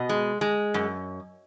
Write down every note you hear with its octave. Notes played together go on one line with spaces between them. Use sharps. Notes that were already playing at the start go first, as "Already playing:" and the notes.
Already playing: B2 D#5
G#3
G#3
F#2